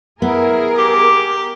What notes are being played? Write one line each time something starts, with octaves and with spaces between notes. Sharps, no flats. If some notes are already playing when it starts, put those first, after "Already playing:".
B3 E4 G#4 A#4
G4 D6